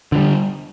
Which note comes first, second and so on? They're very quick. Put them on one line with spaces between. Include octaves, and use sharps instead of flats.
D3 E3 G3